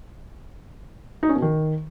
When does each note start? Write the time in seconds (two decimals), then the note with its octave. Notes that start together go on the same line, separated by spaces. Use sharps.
1.23 D#4
1.29 C#4
1.36 B2
1.42 D#3